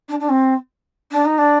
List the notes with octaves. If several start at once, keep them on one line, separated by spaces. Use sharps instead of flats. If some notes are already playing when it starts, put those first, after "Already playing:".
D4
D4
C4
D4
D#4
D4